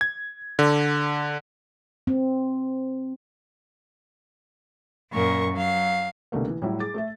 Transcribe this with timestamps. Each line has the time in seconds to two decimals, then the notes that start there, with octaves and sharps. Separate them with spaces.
0.01 G#6
0.59 D3
2.07 C4
5.11 F#2 A#2 A#4 C#6
5.52 F#3 F5
6.32 C2 B2 D3 A3 A#3
6.48 E3
6.62 A2 F#3 G3 E4
6.80 G#4 D6 A6
6.94 A3 A4 E5